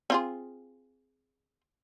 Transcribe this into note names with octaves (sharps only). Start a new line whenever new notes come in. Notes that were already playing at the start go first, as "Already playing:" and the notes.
C4 F4 G#4